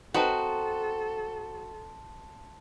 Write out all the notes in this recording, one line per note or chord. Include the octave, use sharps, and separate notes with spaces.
C4 D#4 F#4 A4 B4 A5 C6